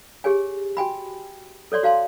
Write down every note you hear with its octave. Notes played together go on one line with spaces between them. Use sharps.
G4 G#4 C#5 G#5
F#4 G5 G#5 B5
A4 C#5 D5 C6
F#4 F5 A5 C6